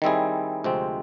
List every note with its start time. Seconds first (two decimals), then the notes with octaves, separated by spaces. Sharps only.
0.02 D#3 G3 C4 E4 G#4
0.64 D2 C3 F3 G#3 C4